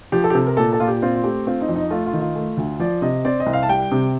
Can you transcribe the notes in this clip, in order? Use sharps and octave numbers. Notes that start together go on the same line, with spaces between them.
F3 G4
A4
G4
C3 A4
A#4
A#2 A4
A4
A#2 F4
G4
C4 F4
F4
A3 G4
C4 F4
D#4
F2
D#4
A3 F4
F4
D#3
F4
A3
D2
F3 D5
C3 D#5
C4 D5
D#5
C2
F5
A5
G3 G5
C3